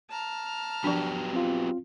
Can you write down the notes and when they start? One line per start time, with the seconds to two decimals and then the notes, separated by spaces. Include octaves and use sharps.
0.10 A5 A#5 F6
0.84 F3 F#3 B3 D4 G4
1.33 C4 F4